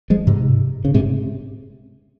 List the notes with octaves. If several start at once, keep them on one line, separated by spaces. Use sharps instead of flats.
F3 G#3
G#2 C3
C#3
G#2 C3